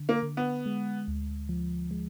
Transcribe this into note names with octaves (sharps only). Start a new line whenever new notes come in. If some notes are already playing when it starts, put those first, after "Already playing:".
Already playing: D3
A#3
D3
B3
G#3
D2
F3
G#3